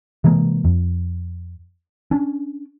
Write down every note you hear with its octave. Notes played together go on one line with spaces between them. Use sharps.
C3 E3 G#3 A#3
F2
C#4 D4